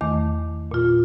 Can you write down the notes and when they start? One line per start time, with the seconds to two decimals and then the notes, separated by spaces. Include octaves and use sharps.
0.01 E2 D#3 A3 D6
0.71 A#2 F4